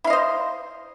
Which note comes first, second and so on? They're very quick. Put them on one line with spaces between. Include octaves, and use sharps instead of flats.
E4 F5 D#5 C5